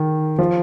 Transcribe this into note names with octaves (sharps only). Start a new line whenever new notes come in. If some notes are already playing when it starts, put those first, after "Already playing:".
Already playing: D#3
F3